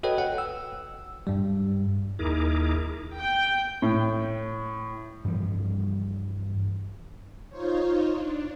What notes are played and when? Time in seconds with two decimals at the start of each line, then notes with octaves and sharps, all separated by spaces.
0.03 F#4 A4 B4 C#5 D#5 G5
0.18 F#5 G5
0.38 E6
1.27 G2 G3
2.19 D#2 D#4 E4 G#4 A#4 D6
3.15 G5
3.82 A2
5.25 G2 E3 F3 G3
7.49 D#4 F4 C5 C#5
8.11 D4